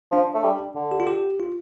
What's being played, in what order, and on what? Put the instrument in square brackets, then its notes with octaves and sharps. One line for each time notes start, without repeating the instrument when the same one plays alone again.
[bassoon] F3 [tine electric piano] D4
[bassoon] A3
G3
D3
[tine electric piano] G4
F4
G4
F4